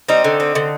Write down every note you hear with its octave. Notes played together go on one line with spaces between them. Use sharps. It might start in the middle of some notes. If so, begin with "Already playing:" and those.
G3 C4 D#4
D3
C4
D3